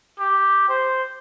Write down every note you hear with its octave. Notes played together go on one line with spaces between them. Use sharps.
G4
C5